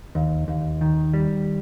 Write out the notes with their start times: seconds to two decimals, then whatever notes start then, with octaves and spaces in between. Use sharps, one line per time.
0.15 D#2
0.48 D#2
0.81 D#3
1.13 G3